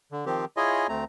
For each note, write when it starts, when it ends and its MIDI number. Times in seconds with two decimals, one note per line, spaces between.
0.12 0.25 50
0.26 0.45 51
0.26 0.45 53
0.26 0.45 60
0.26 0.45 67
0.57 0.87 64
0.57 0.87 65
0.57 0.87 68
0.57 0.87 73
0.57 0.87 75
0.57 0.87 80
0.89 1.04 38
0.89 1.04 57
0.89 1.04 60
0.89 1.04 82